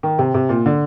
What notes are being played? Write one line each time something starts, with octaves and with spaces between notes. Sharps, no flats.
D#3
C3
C3
A#2
D3